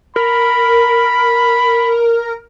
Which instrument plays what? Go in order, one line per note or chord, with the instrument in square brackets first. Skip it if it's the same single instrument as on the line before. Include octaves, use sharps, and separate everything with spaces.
[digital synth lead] A#4 [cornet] B5